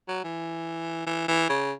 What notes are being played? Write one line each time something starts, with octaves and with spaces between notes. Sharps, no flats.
F#3
E3
E3
E3
C#3